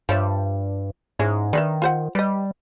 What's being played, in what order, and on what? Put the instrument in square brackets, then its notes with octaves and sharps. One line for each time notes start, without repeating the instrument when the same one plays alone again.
[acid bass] G2 [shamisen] F3 C#5 E5
[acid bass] G#2 [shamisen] C#4 E4 G#4
[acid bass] D#3 [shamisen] D4 B4 E5
[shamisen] F4 C5 F#5
[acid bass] G3 [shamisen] B4 D#5